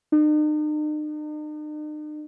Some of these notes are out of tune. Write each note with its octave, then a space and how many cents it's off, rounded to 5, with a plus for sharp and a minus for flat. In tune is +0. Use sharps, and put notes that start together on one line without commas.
D#4 -45